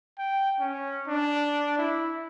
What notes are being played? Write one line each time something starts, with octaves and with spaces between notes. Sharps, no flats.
G5
C#4
D4
E4